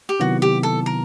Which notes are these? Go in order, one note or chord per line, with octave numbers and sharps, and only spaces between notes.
G4
C3 D#3 F#3 B3 E4 F#4
G4
A4
A#4